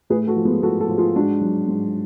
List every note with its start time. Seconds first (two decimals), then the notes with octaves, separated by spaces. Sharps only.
0.10 A2 G#4 B4
0.27 F#4 A4
0.36 F3
0.45 G#3 B3
0.62 A2 F#4 A4
0.80 F#4 A4
0.89 F3
0.98 F4 G#4
1.16 G#2 D4 F#4
1.41 F#3
1.68 G#2